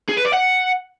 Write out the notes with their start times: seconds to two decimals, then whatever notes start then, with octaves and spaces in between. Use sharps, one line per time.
0.09 G#4
0.17 B4
0.25 D5
0.34 F#5